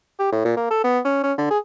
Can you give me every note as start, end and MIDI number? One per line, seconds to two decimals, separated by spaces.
0.19 0.30 67
0.32 0.43 45
0.45 0.55 46
0.57 0.70 58
0.71 0.82 69
0.84 1.00 59
1.05 1.20 61
1.23 1.33 61
1.38 1.45 50
1.50 1.58 68